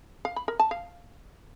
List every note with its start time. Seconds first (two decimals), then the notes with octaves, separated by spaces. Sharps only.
0.25 F5
0.36 B5
0.48 A#4
0.60 A5
0.71 F5